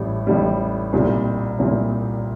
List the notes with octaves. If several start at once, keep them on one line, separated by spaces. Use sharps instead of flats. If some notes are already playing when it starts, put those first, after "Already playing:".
Already playing: A1 A2 G3
A1 A2 G3
C2 A#2 G3
C2 A#2 G3